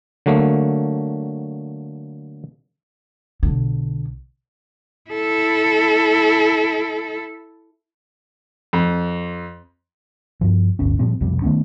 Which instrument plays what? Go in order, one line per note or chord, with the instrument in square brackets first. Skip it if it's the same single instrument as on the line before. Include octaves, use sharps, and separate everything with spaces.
[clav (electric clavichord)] D3 F#3 A3 A#3
[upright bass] B1 D3
[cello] E4 A4
[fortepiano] F2
[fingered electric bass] G2 F3
D1 G1 C#4
A#2 F3 G3 C4
B1 F2 C3 G3
D#3 A3 B3 C#4